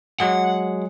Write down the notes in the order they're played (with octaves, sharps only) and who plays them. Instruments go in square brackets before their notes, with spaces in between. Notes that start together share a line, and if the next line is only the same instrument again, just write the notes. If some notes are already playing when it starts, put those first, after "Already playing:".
[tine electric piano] F#3 G#3 G#4 [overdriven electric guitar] F#5